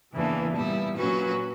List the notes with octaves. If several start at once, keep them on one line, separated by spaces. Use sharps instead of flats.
E2 C#3 E3 A#3 D4
A#2 G3 B3 E4
A#2 F#3 C#4 F#4 B4